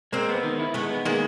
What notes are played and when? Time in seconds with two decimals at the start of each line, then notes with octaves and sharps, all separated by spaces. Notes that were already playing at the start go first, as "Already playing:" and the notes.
0.12 G#3 A#3 C4
0.29 B3
0.43 D#3
0.60 E4
0.74 G#3 A3 B3
0.91 B3
1.05 D#3 G#3 A#3